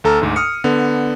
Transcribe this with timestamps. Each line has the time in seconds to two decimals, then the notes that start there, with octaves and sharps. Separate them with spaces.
0.04 D2 A4 A#5 E6 F6
0.22 D2 G#2
0.36 D#6 F6 C#7
0.64 D3 B3